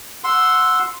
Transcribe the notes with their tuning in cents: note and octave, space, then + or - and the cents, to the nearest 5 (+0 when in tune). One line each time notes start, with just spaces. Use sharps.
F#5 -15 C6 +0 E6 +0